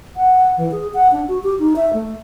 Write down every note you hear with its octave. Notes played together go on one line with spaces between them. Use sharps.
F#5
E3
G#4
F#5
D4
F#4
G4
D#4
E5
A3